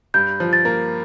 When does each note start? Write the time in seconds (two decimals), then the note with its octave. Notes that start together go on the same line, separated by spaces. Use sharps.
0.14 G2 G6
0.40 F3
0.53 A6
0.65 A#3